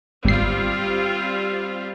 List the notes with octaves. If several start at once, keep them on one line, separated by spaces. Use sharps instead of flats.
G#1 G3 C4 F4 C7